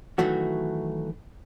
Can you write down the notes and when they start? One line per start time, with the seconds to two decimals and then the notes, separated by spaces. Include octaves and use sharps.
0.18 D#3 E3 F#3 A3 F#4